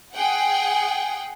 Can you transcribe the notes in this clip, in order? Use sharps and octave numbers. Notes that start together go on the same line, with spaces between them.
G#4 F#5 G5